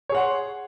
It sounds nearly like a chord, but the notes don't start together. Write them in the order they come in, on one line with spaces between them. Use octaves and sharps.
C#5 G#4 F#5 C6